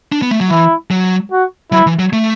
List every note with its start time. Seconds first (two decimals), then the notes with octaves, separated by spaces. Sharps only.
0.12 D4
0.22 B3
0.31 A3
0.41 F#3
0.50 E3 E4
0.91 F#3
1.31 F#4
1.72 F#3 E4
1.87 E3
1.99 F#3
2.13 A3